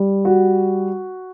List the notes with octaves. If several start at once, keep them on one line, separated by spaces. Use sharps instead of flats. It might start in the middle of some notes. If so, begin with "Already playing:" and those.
Already playing: G3
F#4